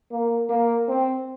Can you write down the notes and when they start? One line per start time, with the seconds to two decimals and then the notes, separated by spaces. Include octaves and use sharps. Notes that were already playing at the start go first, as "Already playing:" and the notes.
0.11 A#3
0.50 A#3
0.89 C4